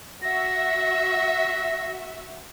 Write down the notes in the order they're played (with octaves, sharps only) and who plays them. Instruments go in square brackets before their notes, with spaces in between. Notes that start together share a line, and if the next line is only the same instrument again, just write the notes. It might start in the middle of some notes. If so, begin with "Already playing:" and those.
[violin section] F#4 E5 [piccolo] A#6